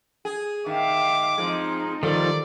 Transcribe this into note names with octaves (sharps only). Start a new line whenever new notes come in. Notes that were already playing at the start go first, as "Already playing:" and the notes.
G#4
D#3 E5 F5 D6
F3 G#3 C4 D#4
D#3 F3 G3 A4 D5